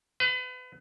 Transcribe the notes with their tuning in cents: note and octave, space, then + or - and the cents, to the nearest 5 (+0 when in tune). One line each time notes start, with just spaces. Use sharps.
B4 +35 F5 +0